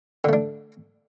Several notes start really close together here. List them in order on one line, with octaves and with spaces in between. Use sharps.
D3 A3 D4